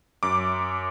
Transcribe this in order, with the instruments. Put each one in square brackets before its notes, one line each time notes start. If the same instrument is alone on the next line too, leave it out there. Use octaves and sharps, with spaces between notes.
[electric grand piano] F#2 D6